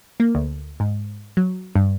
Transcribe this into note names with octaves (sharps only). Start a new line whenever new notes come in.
A#3
D2
G#2
F#3
G2